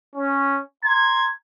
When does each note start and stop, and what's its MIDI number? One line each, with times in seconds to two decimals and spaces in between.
0.16 0.59 61
0.85 1.31 82
0.85 1.31 84
0.85 1.29 92